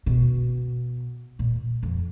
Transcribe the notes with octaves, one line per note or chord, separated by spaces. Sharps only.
B2
A#2
F2